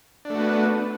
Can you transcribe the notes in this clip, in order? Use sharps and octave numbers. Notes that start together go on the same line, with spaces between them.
A3 B3 D4 F#4